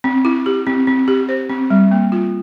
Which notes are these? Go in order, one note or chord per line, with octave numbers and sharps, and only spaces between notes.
C4
E4
G4
C4
C4
G4
C5
C4
G3
A#3
F4